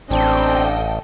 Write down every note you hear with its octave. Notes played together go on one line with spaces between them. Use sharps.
A1 C4 D4 A4 D#5 G5